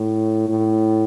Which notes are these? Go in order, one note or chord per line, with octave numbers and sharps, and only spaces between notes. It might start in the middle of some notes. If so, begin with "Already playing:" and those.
Already playing: A2
A2